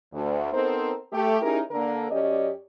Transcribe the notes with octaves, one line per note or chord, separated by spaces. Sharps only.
D2
B3 C4 D#4 A4 A#4 C5
A3 G4
C#4 D#4 E4 G4 G#4 A#4
D3 A#3 D4 A4 A#4
F#2 C#4 G4 D5 D#5